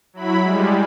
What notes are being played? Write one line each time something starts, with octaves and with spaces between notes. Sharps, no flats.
F#3 E4 B5
G3 G#3